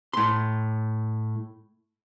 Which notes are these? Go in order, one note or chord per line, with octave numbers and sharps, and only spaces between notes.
A2 C6